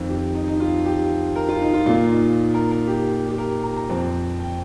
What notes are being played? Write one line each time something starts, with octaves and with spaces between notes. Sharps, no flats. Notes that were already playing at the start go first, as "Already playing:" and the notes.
Already playing: F2 D#3 C4
G4
D#4
D#4
F4
G4
A#4
F4
D#4
F4
A#2 A#3 F4
D#4
A#4
A#4
G4
G4
A#4
A#5
A#5
F2 F3 C4
G5